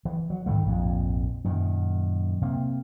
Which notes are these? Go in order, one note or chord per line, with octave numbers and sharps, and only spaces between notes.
E3
F#3
G#2 D#3 G3 A3
A#1 F2 G#2
F#2 A#2 D#3
C3 A#3